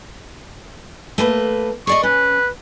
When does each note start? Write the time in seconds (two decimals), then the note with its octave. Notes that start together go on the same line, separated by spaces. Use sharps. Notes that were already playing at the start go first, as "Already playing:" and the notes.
1.18 A3 A#3 B4
1.87 G#4 D5 D#5 C#6
2.03 C#4 B4